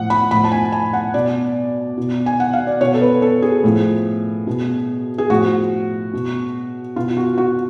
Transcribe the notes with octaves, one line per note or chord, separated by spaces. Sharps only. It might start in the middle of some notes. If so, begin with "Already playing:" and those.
Already playing: A2 F3 F#5
B5
A2 F3 B5
A5
G#5
G#5
F#5
B2 D5
B2
G#5
F#5
F5
D5
B2 C#5
A4
B4
A4
G#4
A2 F3
B2
G#4
A2 F3 F#4
B2
B2 F4
F#4
F#4